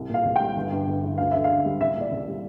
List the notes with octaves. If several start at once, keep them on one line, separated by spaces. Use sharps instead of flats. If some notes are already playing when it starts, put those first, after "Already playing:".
Already playing: C2
A#2 F5
C2
G3 G5
G1
G2
G1
E3
D2 F5
D3 E5
F5
D2
G3
C2 E5
A#2
D5
C2
G3